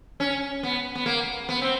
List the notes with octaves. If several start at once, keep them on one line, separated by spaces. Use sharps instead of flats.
C#4
B3
B3
A#3
B3
C4